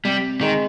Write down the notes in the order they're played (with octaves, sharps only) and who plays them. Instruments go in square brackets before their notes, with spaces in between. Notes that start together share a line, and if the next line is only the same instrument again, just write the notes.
[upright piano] C3 [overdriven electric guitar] G3
[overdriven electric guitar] D#3 [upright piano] G#3